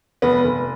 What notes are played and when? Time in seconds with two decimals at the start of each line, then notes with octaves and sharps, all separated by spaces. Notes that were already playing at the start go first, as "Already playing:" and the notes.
0.22 F1 B3
0.44 F1